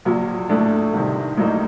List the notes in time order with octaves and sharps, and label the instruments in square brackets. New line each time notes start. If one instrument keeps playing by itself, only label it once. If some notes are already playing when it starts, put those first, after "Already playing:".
[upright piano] A#1 A#2 F#3
A#1 A2 A3 D4
C2 C3 D#3
A#1 A2 F#3 A#3 D#4